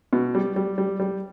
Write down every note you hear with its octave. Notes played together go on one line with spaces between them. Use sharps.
B2
G3
G3
G3
G3